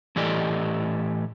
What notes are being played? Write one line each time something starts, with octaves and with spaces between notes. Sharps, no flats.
A2 E3 G4 A4 D5 D#5